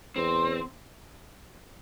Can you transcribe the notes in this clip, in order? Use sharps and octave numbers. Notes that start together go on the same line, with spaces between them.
E2 C4